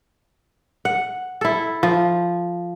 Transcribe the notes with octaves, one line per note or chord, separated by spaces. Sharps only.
F#5
E4 A4
F3